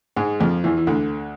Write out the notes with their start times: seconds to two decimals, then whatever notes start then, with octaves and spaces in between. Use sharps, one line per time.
0.16 G#2 G#3
0.40 F2 F3
0.64 E2 E3
0.77 E3
0.87 D2 D3